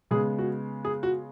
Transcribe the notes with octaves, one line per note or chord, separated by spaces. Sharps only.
C#3 G#3 B3 G#4
F#4
G#4
F#4